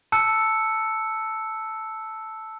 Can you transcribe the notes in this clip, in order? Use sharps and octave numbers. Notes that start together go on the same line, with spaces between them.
A5 E6 F#6 C#7